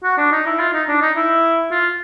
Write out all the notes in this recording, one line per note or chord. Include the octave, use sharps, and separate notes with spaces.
F#4
D4
D#4
E4
F4
D#4
D4
D#4
E4
F4